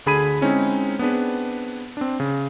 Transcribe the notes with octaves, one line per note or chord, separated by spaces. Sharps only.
D2 D3 G#4 B5 G#6 D#7
G#3 C4 C#4 D#4 E4
B3 C4 D4 G#4 B4
C4 D4
C#3